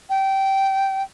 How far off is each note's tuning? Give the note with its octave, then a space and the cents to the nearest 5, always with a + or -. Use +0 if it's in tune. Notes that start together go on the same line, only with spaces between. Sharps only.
G5 -15